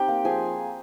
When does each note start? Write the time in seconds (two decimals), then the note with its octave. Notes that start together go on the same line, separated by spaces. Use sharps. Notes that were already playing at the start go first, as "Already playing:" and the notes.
Already playing: C4 D#4 G4 G5
0.08 A#3
0.25 F3 G#4 G#5